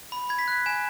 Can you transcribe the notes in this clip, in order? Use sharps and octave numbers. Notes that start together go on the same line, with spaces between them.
B5
B5 G#6
B6
F#6
G#5 E7